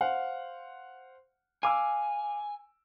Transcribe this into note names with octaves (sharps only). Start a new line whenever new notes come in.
C5 F5 F#5
F5 G#5 D6 E6